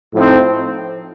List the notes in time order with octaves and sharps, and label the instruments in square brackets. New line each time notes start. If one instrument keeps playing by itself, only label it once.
[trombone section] A2 F3 C4 D#4